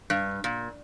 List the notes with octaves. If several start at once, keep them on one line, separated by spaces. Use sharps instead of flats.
G2
A#2